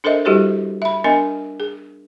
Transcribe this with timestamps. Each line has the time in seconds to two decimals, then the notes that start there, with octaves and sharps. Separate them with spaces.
0.04 D4 A4 A#4 C5 D#5 E5
0.25 G3 E4 F#4 G4 A4 C5
0.82 E5 B5
1.04 B3 D4 A#4 D#5 G#5
1.60 G#4